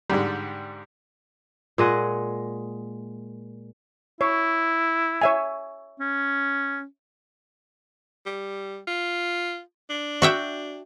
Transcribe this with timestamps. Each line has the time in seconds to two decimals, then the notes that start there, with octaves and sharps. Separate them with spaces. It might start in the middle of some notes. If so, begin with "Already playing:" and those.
0.10 G#2 D3 G3
1.78 A#2 G#3 D#5 F#5
4.21 E4 C#5
5.21 C#5 E5 G#5
6.00 C#4
8.26 G3
8.87 F4
9.90 D4
10.22 F#4 E5 G5